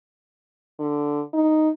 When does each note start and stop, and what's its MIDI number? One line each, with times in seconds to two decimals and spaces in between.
0.79 1.21 50
1.34 1.70 63